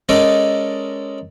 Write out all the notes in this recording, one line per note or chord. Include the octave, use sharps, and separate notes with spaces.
G#3 C#4 A4 A#4 D5 D#5